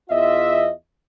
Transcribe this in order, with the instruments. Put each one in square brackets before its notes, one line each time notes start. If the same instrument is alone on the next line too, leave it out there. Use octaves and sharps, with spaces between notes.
[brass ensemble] E2 F4 D#5 E5